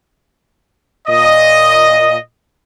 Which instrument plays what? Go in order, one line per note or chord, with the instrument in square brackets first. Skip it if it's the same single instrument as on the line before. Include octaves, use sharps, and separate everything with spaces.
[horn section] A#2 D#5